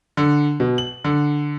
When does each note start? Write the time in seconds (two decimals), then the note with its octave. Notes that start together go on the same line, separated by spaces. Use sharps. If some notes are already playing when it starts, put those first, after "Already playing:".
0.17 D3
0.60 B2
0.78 F#7
1.04 D3